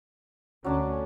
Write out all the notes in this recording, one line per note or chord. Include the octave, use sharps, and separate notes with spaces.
D2 F#3 C#4 D4 A5